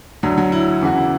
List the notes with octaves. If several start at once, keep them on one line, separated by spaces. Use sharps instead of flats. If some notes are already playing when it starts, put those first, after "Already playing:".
D2 D3 F#3
F#3
E4
E2 C#3 E3 F#4
E4